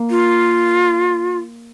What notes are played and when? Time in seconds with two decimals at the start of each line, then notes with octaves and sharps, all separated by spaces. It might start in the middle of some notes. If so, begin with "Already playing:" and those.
Already playing: A#3
0.10 F4